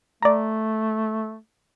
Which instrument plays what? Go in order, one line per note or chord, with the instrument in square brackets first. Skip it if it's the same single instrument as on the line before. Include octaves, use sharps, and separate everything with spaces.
[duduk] A3 [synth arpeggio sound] D5 A#5